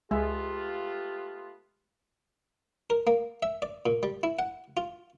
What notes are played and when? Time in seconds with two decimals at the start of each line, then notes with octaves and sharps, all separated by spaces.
0.11 C#2 G#3 A3 B3 F4 G4 G#4 E5
2.90 A#4
3.07 A#3
3.43 E5
3.62 D5
3.86 A#2
4.03 G3
4.23 E4
4.39 F#5
4.77 F4